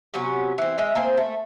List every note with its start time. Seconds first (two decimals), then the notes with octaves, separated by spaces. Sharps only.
0.14 C3 F#3 B3 C#4
0.58 E3 C4
0.78 G#3 D#5 E5
0.95 A#3 C4 G#4 C5
1.17 A3